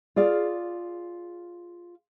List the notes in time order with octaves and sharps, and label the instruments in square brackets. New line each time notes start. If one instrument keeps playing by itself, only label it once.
[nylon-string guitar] F4 G#4 D5 F5